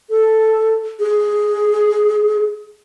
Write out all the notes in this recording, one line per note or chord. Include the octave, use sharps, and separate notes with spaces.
A4
G#4